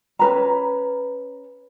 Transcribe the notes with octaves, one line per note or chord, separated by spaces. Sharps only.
C#4 B4 A#5